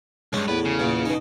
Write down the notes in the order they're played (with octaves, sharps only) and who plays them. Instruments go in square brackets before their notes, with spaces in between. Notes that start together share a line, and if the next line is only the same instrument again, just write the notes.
[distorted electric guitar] C2 G2 [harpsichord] G#3 C#4
[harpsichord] E2 A2 [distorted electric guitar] B4
[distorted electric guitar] C#3
[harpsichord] E2 A#2
B2 D#4